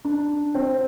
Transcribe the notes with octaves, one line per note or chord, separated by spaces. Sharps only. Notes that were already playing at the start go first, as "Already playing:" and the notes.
D4
C4